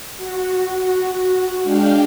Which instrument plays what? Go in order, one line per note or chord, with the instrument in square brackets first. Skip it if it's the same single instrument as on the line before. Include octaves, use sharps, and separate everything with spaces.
[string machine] F#4
G#3 D4 F5 G5